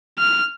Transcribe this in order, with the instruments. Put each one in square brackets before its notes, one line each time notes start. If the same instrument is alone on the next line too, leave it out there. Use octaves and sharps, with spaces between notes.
[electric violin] F6